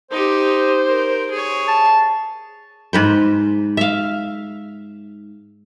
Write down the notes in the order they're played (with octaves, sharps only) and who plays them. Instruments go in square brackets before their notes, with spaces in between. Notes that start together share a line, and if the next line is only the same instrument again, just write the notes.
[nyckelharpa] D#4 G4 [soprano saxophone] C5
[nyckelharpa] A#4
G#4 C#5
[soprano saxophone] A5
[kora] G#2 B4 C5
E5 F5